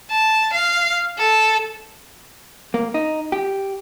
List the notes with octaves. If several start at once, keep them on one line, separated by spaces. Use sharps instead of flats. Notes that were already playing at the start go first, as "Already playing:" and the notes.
A5
F5
A4
A#3
D#4
G4